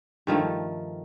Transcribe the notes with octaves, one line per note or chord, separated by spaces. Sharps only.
G2 D#3 F3 A3